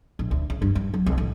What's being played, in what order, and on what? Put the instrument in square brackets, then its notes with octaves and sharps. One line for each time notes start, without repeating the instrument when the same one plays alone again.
[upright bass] A#1
D2
C#3
G2
G2
F#3
C2
A1